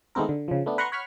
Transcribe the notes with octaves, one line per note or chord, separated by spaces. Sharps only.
D#3 G#3 A3 B3 C4 A#4
D3
C#3 F3
A3 B3 D4
B4 F#5 A#5 C6 C#6
C#5 F#5 B5 C#6 F6